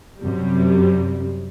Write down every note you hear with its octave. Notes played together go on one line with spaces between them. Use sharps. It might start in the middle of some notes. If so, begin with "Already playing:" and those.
F#2 C3 G3